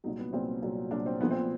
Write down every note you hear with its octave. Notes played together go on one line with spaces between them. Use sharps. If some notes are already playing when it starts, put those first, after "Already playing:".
C2 A#2 F#3 D#4
B3
C2 A#2 F#3 C4
C2 A#2 F#3
C2 A#2 F#3 D4
C4
B1 A#2 F3 B3
C4